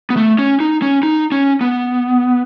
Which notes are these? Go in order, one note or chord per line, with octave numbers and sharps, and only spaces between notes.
B3
A3
C#4
D#4
C#4
D#4
C#4
B3